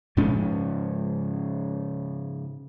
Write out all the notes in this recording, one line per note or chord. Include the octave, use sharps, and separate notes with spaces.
G#2 C#3 F3 C#4